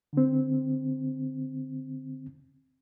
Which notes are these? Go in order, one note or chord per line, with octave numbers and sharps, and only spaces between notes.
D3 C4